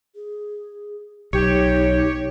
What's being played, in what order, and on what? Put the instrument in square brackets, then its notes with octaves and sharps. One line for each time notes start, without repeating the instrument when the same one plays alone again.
[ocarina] G#4
[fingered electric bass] B1 [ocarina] D#4 [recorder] G4 [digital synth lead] C#5